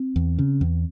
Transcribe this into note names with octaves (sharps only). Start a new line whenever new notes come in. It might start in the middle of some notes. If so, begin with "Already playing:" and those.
Already playing: C4
E2
C#3
E2